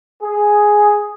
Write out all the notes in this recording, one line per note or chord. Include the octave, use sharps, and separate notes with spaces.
G#4